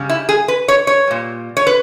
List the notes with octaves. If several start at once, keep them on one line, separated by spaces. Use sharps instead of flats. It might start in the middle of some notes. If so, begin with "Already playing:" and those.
Already playing: C#3 G3
E4
G#4
B4
C#5
C#5
A#2 G3
C#5
B4